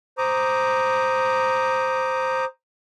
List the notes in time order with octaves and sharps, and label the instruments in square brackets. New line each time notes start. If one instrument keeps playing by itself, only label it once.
[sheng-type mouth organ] C5 A#5 D6 D#6